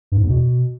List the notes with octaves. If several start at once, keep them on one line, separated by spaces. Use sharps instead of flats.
G2
G#2
E2
B2